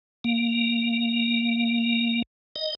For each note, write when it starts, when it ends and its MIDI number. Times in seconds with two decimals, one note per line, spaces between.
0.24 2.22 58
2.56 2.75 75